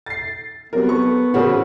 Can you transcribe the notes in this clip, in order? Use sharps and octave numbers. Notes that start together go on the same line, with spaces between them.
A6 C7
F#3 G3 B3 C4 A#4
A4 C#6
C#3 E3 F#4 G#4 A#4 C5 C#5 F#5